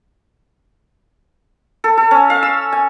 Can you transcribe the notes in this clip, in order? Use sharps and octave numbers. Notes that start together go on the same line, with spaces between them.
A4
A4
C#4
F5
E6
G#5